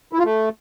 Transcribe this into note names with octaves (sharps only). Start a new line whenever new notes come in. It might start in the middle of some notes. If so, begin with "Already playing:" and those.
E4
F4
A3